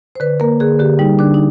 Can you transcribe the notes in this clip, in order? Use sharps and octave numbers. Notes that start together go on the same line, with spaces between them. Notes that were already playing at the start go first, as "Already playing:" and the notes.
C5
D3 B4
A#3 A#4
D3 G#4
D3 G4
G3 D#4
D3 D4
D#4